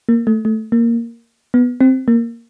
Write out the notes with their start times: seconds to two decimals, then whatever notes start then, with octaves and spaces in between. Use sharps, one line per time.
0.09 A#3
0.27 A3
0.45 A3
0.72 A#3
1.54 B3
1.81 C4
2.08 A#3